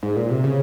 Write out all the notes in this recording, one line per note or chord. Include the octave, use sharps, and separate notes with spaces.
G#2
A#2
C3
C#3